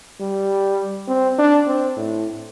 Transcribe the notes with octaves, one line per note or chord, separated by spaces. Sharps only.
G3
C4
D4
C4
A2